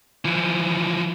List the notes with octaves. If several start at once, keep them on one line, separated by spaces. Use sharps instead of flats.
E3 F3